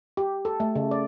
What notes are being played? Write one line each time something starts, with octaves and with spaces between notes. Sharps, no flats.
G4
A4
A3
C#3
D5